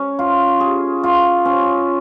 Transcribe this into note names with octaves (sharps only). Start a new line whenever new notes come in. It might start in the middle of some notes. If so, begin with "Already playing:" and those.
Already playing: C#4
F4
G#4
F4
C#4